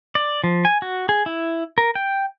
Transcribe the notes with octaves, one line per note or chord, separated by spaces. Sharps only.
D5
F3
G#5
F#4
G#4
E4
A#4
G5